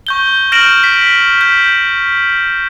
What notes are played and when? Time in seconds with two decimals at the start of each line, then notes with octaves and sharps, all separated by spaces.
0.07 C#6 G6 G7
0.52 F6 G6 A#6 D7 E7 F#7
0.84 B6
1.41 G6